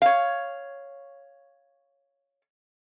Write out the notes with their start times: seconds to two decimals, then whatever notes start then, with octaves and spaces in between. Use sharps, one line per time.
0.02 C#5 F5